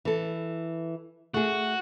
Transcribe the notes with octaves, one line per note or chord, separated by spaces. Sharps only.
E3 A4
A3 F#4 G#4